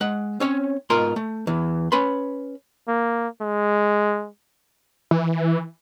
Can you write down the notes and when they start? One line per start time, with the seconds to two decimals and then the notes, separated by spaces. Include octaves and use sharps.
0.01 G#3 F#5
0.40 C4 C#4 C#5
0.90 G#2 B2 F4 A#4 C6
1.16 A3
1.47 E2 E3
1.92 C#4 B4 B5 C6
2.88 A#3
3.41 G#3
5.11 E3